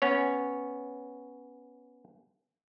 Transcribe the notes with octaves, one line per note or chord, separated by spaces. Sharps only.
B3 C#4 C#5